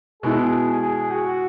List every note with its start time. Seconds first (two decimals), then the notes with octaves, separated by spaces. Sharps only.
0.22 B2 G#3 B3 E4 G#4
0.81 G#4
1.11 F#4